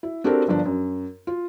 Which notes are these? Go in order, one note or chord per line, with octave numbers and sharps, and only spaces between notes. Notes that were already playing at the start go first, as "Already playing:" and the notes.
E4
C4 D4 F#4 G4 A4 A#4
G1 F3 D4
F#2
F4